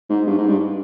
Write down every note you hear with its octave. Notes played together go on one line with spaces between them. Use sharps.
G#2
G2
G#2
G2